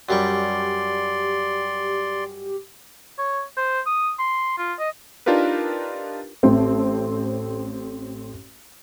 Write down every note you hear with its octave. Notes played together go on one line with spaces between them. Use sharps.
F#2 G3 G4 D5 C6 C#6
C#5
C5
D#6
C6
F4
D#5
D4 D#4 F4 G4 A#4 B4
A1 A3 C4 A4 C5